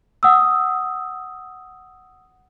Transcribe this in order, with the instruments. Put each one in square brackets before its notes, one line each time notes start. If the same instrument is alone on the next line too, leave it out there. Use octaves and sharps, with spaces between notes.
[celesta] F#5 D#6 E6